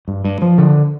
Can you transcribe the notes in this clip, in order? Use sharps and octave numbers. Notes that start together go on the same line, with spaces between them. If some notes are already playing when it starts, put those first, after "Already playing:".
G2
G2
F3
D3